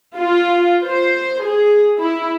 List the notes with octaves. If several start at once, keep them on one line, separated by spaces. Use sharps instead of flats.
F4
C5
G#4
E4